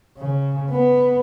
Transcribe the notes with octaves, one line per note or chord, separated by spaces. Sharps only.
C#3
B3